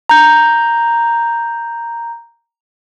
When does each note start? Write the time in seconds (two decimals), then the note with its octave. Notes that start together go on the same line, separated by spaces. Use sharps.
0.09 A#5 G6